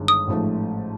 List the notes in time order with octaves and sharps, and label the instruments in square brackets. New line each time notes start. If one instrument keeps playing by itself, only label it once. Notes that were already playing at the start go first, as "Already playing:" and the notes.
Already playing: [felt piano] G1 G2 D#3 G#3
[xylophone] D#6
[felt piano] A1 G#2 F3 A3